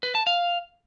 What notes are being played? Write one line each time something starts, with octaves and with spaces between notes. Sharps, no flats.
B4
A5
F5